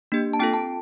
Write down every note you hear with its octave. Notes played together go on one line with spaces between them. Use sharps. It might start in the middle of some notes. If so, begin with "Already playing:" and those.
A#3 D4 G4
A5
C4 F4 A4 G5
A5